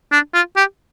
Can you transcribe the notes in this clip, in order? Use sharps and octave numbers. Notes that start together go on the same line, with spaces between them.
D4
F4
G4